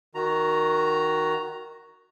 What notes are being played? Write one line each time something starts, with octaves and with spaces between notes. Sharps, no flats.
D#3 F#4 A#5